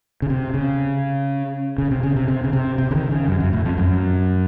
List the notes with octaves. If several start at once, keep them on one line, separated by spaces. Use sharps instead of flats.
C#3
C3
C#3
C#3
C3
C#3
C3
C3
C#3
C3
C3
C#3
D#3
C#3
F#2
F#2
A2
F2
F#2